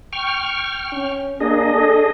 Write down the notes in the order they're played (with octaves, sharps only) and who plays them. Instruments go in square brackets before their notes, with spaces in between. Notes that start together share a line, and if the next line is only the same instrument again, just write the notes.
[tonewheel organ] G5 C#6 F6
[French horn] C#4
[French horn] A#3 [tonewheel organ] D4 G#4 D#5
[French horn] A4